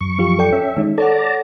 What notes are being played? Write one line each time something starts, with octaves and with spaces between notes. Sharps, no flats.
F#2 C#6
F3 F4 G4
A4 D5 G5
C#4 E5
D#3 G#3 D#4
A4 C#5 D5 F#5 A5 A#5